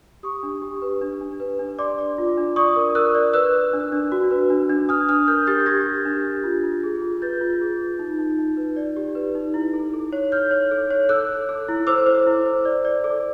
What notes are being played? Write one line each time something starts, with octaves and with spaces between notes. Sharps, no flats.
G4 C#6 D#6
D4
G4
B4
D4
D4
B4
D4
D5 C6 D6
D5
F4
D4
D5 C#6 D#6
A#4
A#4 E6 F#6
D5
B4 E6 F#6
B4
D4
D4
F#4
B4
D4
D4
D4 D#6 F6
D4 D#6 F6
A#4 F6 G6
G4 G6 A6
G4 G#6 A#6
G4
D4
G4
F4
F4
G#4
F4
B4 G6 A6
F4
G#4
F4
D#4
D#4
D#4
B4
D5
G4
B4
D#4
E4
A4
A4
C#5
C#5 F6 G6
C#5
A4
C#5
A4 E6 F#6
A4
A4
E4
C5 D6 E6
C5
E4
C5
D5
D5
A4